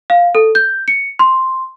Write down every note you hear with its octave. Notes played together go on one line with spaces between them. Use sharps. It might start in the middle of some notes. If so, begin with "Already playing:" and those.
F5
A4
G6
C#7
C6